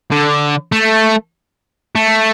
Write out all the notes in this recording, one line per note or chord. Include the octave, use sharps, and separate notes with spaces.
D3
A3
A3